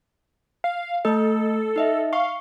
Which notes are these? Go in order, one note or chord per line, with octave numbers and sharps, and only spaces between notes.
F5
A3 A4 D#5
D#4 D#5 E5
F5 C#6